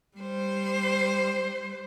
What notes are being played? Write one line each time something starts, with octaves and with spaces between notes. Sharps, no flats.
G3 C5